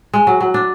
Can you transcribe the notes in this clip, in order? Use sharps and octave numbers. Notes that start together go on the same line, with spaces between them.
G#3
F#3
F#3
D4